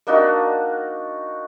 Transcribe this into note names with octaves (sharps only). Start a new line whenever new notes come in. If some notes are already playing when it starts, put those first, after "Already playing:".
A#3 D4 D#4 F#4